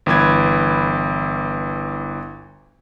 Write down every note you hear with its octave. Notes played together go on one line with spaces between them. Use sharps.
G1 E3 B4 G#6